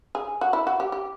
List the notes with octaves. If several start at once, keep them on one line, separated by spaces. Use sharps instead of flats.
G#4
F#4
E4
F#4
G4
G4